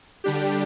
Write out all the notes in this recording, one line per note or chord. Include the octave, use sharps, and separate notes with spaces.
D3 G3 D4 G4